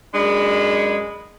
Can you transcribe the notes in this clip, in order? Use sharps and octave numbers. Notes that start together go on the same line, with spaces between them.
F#2 G#3 D4 B5